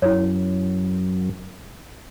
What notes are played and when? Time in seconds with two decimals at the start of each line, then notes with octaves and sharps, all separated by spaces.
0.02 F#2 E4 C#5